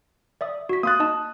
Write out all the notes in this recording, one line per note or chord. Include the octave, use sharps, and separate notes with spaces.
D5 E5 D#6
F#4 B6
A#3 C6 D#6 F#6 A6
D#4 D#5 A5